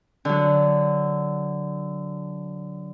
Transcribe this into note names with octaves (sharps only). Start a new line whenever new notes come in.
D3 F#3